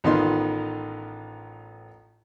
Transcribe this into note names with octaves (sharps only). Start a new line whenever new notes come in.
A1 D#3 B3 D#4 F4 C6